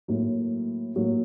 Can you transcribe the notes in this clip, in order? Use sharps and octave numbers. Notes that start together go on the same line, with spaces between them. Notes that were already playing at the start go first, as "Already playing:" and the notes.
A2 F#3 A#3
A2 F#3 A#3